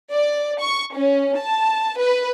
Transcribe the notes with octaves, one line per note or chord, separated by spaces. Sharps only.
D5
C#6
C#4
A5
B4